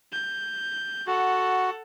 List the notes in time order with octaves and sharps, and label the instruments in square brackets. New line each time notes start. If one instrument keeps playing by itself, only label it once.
[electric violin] G6
[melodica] F#4 [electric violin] A4 F#5